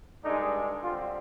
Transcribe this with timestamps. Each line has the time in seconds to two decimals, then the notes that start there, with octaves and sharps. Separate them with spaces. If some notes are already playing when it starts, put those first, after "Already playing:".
0.24 G2 D3 G#3 D4 D#4
0.83 D3 G3 C4 F4